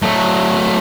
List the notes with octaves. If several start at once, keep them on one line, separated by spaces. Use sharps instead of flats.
F#3 A3